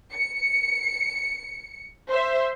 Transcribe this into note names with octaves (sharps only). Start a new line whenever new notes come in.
C#7
C5 E5